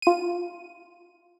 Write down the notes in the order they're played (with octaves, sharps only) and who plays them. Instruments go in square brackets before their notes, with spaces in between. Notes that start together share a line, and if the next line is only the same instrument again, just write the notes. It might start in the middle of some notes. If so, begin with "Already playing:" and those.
[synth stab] F4 D#7